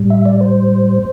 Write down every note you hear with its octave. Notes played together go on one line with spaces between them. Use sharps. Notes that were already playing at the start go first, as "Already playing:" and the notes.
Already playing: A2 G3
E5
D5
C5